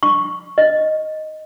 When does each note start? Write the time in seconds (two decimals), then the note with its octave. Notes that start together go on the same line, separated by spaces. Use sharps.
0.03 C#6
0.58 D#5